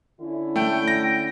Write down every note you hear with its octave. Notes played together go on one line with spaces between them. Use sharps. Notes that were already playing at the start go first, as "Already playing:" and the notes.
D3 C#4 E4
A3 G5
A#6